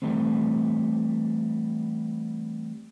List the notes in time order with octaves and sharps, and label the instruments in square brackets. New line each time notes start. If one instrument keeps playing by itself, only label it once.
[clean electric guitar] E3 G3 A3 B3 C4